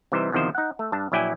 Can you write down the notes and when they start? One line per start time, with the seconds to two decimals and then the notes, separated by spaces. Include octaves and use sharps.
0.12 C3 E3 G3 D#4 C5
0.32 E2 C3 D#3 F3 C5
0.55 D#4 F#5
0.79 A3
0.92 G2 D4 A5
1.12 A#1 F#3 E4 D5 G5 G#5